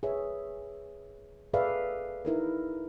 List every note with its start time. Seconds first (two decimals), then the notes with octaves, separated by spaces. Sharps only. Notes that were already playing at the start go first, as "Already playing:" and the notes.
0.03 G#4 B4 C#5 E5
1.54 G#4 A4 B4 D5 E5 F5
2.25 D#4 E4 A#4 B4